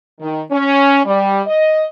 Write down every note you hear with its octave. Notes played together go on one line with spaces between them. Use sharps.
D#3
C#4
G3
D#5